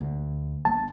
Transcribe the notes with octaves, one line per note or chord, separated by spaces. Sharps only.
D2
G1 A#3 A5